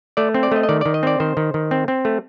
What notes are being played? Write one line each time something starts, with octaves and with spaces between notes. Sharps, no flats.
A3 D5
C4
D5
A3 D#5
D#5
D#3 D5
D#3 D5
D#5
C4 D5
D#3 C5
D#3
D#3
C4
C4
A3